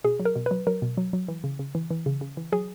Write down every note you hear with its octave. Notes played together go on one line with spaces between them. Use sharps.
B2 G#4
F#3
A#4
B2
F#3 B4
F#3 A#4
B2
F#3
F#3
E3
C#3
C#3
E3
E3
C#3
C#3
E3
F#3 G#4